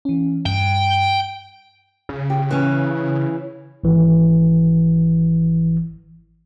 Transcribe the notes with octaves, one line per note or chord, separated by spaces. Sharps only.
E3 C#4
G2 G5
C#3
G4
E3 C#4
G#1 E3